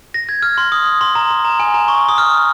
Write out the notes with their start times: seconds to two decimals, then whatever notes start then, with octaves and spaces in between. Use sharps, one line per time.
0.14 A#6
0.29 G#6
0.43 F6
0.58 C6
0.72 D#6
1.01 C6
1.15 A#5
1.30 C6
1.45 A#5
1.60 G#5
1.74 A#5
1.88 C#6
2.09 D#6
2.18 F6